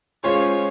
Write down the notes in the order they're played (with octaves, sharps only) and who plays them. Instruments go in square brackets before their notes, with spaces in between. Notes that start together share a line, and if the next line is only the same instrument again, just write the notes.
[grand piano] G#3 C#4 F4 G#4 C5 [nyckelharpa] C#5